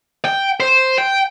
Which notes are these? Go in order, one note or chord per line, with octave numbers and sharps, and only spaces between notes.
G5
C5
G5